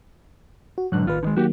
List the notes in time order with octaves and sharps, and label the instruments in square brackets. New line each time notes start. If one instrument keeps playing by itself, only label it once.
[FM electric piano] F#4
[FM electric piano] G#2 F#6 [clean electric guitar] B2 D3 F#3
[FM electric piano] A1 B4 [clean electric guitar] D#2 F4
[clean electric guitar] D3 D#3 G#3
[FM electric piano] D#3 F#3 A#3 [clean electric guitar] F#4 G4